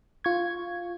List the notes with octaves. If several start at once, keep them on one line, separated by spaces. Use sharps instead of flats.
F4 C#6 G#6